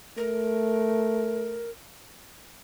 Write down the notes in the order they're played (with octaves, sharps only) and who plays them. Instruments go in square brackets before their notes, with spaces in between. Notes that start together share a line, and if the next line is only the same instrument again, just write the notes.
[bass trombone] A3 [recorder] A#4